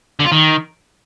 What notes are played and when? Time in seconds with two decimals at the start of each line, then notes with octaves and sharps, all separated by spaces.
0.20 D3
0.26 F4
0.32 D#3